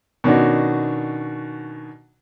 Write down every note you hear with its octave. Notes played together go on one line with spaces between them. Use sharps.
B2 D#3 C#4 D4 F#4